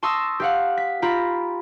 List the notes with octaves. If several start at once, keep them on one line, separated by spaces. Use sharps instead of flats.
A5 C6 C#6 D#6 E6 A#6
G4 F5 F#5
B6
F4 G4 A#5 B5